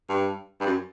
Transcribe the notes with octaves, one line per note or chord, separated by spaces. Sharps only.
G2
G2
F#2